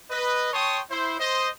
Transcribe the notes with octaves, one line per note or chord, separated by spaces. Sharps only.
B4 D#5
C#5 G5 A5 C6 C#6 D#6
E4 C5
C5 D#5